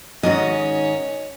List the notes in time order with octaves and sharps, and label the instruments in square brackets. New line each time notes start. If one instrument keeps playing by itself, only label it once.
[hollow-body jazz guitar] G#2 D#3 F#4 [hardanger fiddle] C#4 [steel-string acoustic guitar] D#5